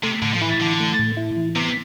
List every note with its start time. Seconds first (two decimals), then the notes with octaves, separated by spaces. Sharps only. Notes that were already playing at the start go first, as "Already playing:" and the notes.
0.03 C3 A3
0.22 A2 D3
0.33 F3
0.41 E3 E4
0.60 D3 E3
0.80 A3
0.99 A2
1.17 E4
1.37 E3
1.56 C3 B3